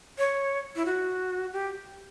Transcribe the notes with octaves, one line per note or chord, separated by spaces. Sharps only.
C#5
E4
F#4
G4